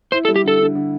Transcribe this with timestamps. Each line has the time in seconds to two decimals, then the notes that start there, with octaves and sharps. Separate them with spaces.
0.12 E4 C5
0.25 A4
0.28 G3
0.36 G4
0.44 D3 A4
0.60 D3
0.75 D3